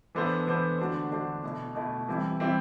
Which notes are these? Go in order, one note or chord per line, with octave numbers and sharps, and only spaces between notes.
E3 B3 D4 A4 C5
E3 B3 D4 A4 C5
D3 A3 D4 F#4 C5
D3 A3 D4 F#4 C5
B2 A3 E4
B2 A3 E4
E3 G3 C4 E4
E3 G3 C4 E4